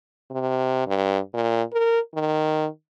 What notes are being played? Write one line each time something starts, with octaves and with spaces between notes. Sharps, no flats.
C3
G2
A#2
A#4
D#3